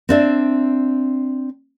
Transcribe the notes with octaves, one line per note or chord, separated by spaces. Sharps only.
C4 D4 E5